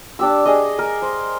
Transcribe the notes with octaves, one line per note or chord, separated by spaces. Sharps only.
D4 G4 E6
G#4 D#5
A#4
C5